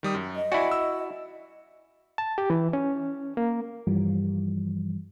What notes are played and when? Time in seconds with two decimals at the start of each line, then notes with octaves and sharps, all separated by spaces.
0.03 D#3 G3 D#6
0.15 F#2
0.36 D#5
0.52 E4 F#4 D5 G#5
0.71 E6
2.18 A5
2.38 G4
2.50 E3
2.73 C#4
3.37 A#3
3.87 G2 E3 F3 G3